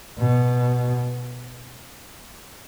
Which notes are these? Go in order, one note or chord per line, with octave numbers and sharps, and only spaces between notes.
B2